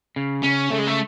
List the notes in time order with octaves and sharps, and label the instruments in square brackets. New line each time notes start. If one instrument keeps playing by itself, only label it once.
[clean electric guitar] C#3
[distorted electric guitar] C#4
[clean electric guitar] C#3 [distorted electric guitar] A3
[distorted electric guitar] G#3
A3